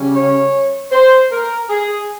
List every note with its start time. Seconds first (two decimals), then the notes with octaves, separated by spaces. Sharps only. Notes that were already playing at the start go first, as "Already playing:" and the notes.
Already playing: C#3 G3 C#4
0.15 C#5
0.92 C5
1.32 A#4
1.70 G#4